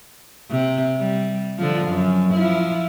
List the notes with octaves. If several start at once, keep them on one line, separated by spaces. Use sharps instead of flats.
C3
G3
D3 F3
F#2
F3 E4